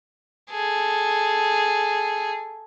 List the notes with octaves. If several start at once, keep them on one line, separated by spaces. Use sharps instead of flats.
G#4 A4